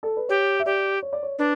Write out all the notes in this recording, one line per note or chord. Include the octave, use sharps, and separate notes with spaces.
A4
B4
G4 C#5
E5
G4 D5
C#5
D5
C#5
D4 B4